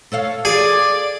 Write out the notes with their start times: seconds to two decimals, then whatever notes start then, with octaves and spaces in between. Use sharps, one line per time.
0.12 A4 C#5 F5
0.45 G#4 D5